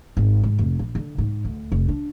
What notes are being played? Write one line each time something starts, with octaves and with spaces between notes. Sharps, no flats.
G#1
G#2
F1
A#1
D3
G#2
D2
F1
D4